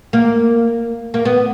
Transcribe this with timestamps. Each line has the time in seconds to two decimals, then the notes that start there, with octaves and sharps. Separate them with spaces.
0.13 A#3
1.14 A#3
1.25 B3